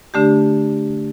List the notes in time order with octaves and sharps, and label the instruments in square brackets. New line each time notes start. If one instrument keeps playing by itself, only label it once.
[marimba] D3 A3 D4 G4